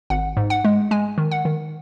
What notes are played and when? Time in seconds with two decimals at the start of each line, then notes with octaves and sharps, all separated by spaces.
0.10 G#1 F#5
0.37 G#2
0.50 F#5
0.65 G#3
0.91 G#3 G#5
1.18 D#3
1.31 F#5
1.45 D#3